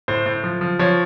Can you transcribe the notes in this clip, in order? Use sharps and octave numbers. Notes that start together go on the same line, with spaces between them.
A2 C5
A2
F3
F3
F3 C#5